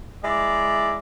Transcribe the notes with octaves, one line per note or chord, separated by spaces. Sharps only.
G#3 E4 D5